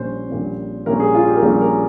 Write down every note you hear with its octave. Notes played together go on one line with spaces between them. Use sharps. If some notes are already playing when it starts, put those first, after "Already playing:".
Already playing: A#1 A#2 G3 C#4 C5
A#1 A#2 G3 C#4
A#1 A#2 G3 C#4 A#4
G#4
F4
G4
A#4
A#1 A#2 G3 C#4 G#4
A#4